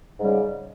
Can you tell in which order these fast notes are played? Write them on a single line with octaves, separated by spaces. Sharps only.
G#2 G3 C#3